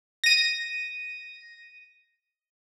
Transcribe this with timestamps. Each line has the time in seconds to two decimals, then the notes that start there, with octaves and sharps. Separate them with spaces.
0.24 A#6 D#7